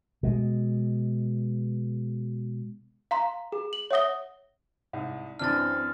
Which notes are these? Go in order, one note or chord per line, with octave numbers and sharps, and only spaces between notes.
B2 G#3
F5 A#5 C6
G#4
F#7
C#5 E5 F#5 D#6 A#6 G7
C2 G#2
F#2 E3 C4 D4 F6 A6